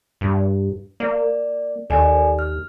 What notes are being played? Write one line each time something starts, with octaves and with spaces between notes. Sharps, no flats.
G2
A#3 D5
D#2 A4 D5 G#5
F6